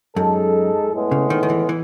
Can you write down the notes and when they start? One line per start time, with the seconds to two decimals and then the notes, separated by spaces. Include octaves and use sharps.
0.16 F#2 G#3 D#4 A4
0.92 A2 G#3 B3
1.11 C#3
1.30 D#3
1.43 D#3
1.50 E3
1.69 E3